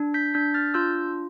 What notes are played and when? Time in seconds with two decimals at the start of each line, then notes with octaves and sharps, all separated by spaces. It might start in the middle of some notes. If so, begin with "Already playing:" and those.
Already playing: D4
0.14 G6 B6
0.34 D4 G6 B6
0.54 F6 A6
0.74 F4 E6 G6